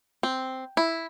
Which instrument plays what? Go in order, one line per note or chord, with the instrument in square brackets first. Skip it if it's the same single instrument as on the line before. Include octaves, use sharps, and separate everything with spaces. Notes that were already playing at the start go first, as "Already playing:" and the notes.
[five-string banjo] C4
E4